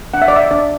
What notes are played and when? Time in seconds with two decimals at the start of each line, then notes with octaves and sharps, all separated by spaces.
0.14 D4 F#5
0.22 E5
0.28 D5
0.33 A4 E5
0.51 D4 D5